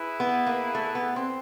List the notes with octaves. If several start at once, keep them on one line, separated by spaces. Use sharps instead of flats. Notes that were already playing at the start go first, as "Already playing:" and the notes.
Already playing: E4 G#4 B4
B3
A#3
A3
B3
C4